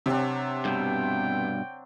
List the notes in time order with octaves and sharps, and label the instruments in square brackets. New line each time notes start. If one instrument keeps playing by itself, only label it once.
[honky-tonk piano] C3 [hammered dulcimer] F#3 C4 D4
[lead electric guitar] G2 B2 [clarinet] G5